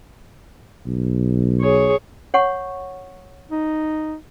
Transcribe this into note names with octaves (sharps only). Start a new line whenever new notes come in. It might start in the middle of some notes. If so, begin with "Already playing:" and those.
B1
G#4 C#5
C#5 F#5 C#6
D#4